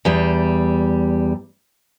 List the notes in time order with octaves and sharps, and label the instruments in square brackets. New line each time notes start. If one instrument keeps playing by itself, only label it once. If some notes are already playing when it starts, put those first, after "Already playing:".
[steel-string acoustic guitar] E2 G3